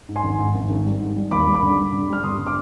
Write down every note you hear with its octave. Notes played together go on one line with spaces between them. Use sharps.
G#2
G#5 C6
G#1
G#2
G#1
G#1
G3
G#2
G3
D#2 B5 D6
G3
B5 D6
D3
G3
D3
G3 F6
G1 C6 D#6
D3
D6 F6